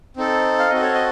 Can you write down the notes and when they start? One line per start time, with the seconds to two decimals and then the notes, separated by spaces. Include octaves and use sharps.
0.17 C4 D#4 A4
0.59 F5
0.70 C4 F#4 A4 D#5
0.82 C#5
0.94 D#5